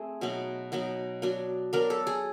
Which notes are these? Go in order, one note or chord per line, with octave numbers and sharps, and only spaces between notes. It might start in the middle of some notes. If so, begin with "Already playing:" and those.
Already playing: A3 C4 G#4
B2 F#3 B3 D#4
B2 F#3 B3 D#4
F#3 B3 D4
F#3 B3 D4 A#4
A4
G#4